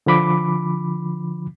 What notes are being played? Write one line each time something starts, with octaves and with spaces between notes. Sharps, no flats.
D3 F3 B5 D6